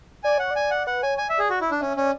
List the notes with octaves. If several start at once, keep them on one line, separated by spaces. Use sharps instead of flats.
D5 G#5
C#5 F#5
D5
G#5
F#5
B4 F#5
C#5 G#5
D5 G#5
E5
G#4
F#4
E4
D4
C#4 E5
C#4 D5